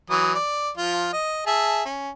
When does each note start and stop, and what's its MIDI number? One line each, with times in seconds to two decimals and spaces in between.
0.10 0.34 52
0.10 0.34 54
0.10 0.34 87
0.35 0.69 74
0.77 1.10 53
0.77 1.10 65
1.13 1.44 75
1.46 1.83 68
1.46 1.83 76
1.46 1.83 81
1.85 2.10 61